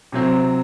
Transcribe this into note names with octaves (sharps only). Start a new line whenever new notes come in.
C3 F#3 C4